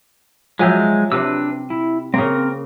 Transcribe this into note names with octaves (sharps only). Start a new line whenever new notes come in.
F3 F#3 G#3 E5 G#5 G6
C3 D4 G4 B4 E6
E4
C#3 A#3 C4 A#4